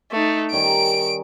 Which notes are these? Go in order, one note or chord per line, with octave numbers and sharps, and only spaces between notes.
A3 D#4
D#3 G3 C#4 D7